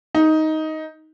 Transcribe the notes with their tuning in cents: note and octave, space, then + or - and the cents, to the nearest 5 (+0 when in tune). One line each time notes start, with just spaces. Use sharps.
D#4 +10